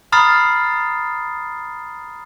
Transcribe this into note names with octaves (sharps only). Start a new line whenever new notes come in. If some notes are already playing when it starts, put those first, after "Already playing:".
A#5 B5 D#6 F6 A6 C7